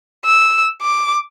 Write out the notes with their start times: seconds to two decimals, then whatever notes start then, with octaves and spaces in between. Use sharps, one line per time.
0.25 E6
0.82 D6